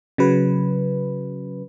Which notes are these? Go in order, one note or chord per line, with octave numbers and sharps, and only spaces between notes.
C#3 F#3 B4